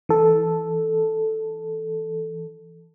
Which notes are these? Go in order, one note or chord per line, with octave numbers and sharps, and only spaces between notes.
E3 A4